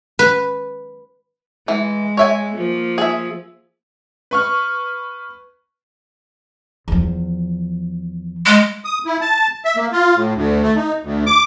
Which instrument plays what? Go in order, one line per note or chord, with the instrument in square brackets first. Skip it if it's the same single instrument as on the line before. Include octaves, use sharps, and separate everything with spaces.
[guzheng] B4
[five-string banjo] E3 [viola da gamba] G#3
[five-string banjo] C#5 E5 G#5
[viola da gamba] F3 A#3
[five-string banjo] G#4 E5
[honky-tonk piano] B4 C#6 F6
[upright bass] E2 F3
[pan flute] G#3
[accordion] D#6
E4
A5
E5
A#3
F4
A2
D2
A3
D#4
D2
D6